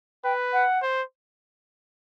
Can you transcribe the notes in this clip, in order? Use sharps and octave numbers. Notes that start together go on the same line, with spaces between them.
B4 G5
F#5
C5